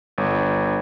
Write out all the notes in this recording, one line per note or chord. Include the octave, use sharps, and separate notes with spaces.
G1